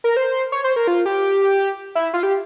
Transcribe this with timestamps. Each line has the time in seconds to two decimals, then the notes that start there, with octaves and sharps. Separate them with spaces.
0.04 A#4
0.17 C5
0.52 C#5
0.64 C5
0.76 A#4
0.87 F4
1.06 G4
1.95 E4
2.14 F4
2.23 G4